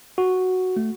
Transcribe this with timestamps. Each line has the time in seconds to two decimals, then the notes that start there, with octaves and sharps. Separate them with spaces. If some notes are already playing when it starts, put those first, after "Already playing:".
0.18 F#4
0.76 A3